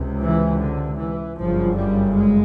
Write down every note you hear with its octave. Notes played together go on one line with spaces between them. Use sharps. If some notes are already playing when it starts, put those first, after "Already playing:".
Already playing: C#2 C3
E3
D3
E3
G1 F#2 C#3 F3
G3
G#3